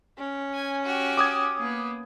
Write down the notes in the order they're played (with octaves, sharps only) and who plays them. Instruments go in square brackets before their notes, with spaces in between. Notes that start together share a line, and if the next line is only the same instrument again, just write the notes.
[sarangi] C#4
[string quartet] G#5
F#4 G4
[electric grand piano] D6 D#6 G#6
[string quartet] A#3 B3